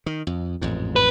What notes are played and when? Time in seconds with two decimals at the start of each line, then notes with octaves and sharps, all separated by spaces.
0.06 D#3
0.27 F2
0.61 A1 F2 G#2
0.96 B4